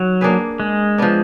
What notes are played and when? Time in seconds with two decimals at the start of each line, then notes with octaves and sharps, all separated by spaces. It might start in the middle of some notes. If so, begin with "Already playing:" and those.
Already playing: D#3 F#3
0.21 A#3 D4 G#4 B4
0.60 G#3
0.98 F3 B3 D4